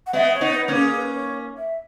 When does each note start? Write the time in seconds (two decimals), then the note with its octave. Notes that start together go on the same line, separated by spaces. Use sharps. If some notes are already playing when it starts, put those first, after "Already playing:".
0.07 F#5
0.13 G#3 B3 E5
0.35 C#5
0.41 B3 D#4
0.54 B4
0.68 A#3 C#4
0.75 G#4
0.96 B4
1.15 C#5
1.57 E5